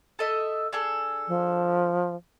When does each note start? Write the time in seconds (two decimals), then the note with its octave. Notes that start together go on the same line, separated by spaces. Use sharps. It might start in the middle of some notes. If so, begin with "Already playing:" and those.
0.19 A4 D#5 E5
0.73 D4 G#4 A4
1.28 F3